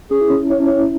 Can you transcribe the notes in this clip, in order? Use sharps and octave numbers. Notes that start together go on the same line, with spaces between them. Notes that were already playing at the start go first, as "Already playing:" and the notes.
C#4 G#4
E4
C#4
E4 C#5
C#4
E4 C#5